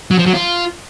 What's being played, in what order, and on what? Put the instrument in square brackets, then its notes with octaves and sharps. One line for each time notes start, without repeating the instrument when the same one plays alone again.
[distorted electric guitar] F#3
F3
F#3
F4